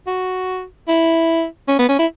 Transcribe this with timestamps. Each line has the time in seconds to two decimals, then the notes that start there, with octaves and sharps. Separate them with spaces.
0.07 F#4
0.88 E4
1.68 C#4
1.79 B3
1.89 C#4
1.99 E4